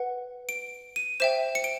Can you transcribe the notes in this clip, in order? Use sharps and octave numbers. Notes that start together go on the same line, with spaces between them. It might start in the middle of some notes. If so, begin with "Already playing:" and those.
Already playing: B4 F#5
D7
D#7
C5 E5 G5 E7
C#7
D7